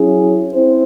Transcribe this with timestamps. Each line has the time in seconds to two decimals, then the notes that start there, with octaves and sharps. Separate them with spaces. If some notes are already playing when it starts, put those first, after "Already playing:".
Already playing: F#3 C#4 E4 G#4
0.53 C4 E4 C5